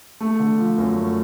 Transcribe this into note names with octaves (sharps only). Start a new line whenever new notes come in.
A3
D3
F3
F#2
A3